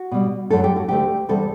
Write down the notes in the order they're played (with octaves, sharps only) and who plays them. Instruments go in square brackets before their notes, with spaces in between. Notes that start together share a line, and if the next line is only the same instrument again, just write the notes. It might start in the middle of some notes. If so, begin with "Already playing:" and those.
Already playing: [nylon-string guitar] F#4
B2 G3
F#2 F#3 A3 A4
G4
F#4
D2 D3 A3 G4
E2 C3 G3 A4